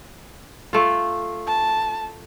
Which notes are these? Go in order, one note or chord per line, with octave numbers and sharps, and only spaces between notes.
A3 F4
A5